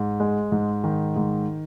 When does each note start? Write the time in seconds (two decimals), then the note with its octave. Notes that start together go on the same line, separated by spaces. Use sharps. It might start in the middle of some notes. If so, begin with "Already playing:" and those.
Already playing: G#2
0.20 G#3
0.52 G#2
0.84 D#3
1.16 G#2